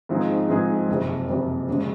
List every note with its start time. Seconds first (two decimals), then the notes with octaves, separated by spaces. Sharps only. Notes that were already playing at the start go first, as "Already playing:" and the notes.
0.09 G#2 F3 C4 D#4 G#4
0.49 G#2 F3 C4 D#4 G#4
0.88 F#1 F2 C3
1.29 F#1 F2 C3
1.69 F2 C#3 G#3